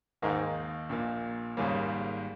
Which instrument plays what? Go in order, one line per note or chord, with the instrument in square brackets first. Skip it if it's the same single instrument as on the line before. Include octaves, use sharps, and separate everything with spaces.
[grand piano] D#2 D#3 A#3 D#4 A#4 [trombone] G#2
[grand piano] A#1 A#2 A#3
[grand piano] G#1 G#2 G3 A#3 [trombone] C#3